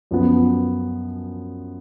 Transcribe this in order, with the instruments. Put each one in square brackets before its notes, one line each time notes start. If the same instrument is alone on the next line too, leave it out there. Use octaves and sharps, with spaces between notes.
[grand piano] F#2 F3 B3